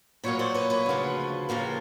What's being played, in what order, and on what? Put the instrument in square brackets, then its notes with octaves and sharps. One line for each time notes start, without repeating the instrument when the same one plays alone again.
[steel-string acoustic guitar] A#2 F#3 A#3 B4 C#5
C5 D5
B4 C#5
B4 C#5
D2 C#3 F3
D#2 C#3 F3 A#3